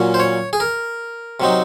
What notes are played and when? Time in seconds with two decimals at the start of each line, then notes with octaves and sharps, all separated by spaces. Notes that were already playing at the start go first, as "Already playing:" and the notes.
Already playing: A#2 F#3 C#4
0.14 C5
0.20 C#5
0.53 G#4
0.60 A#4
1.40 C3 F#3 C4 D#4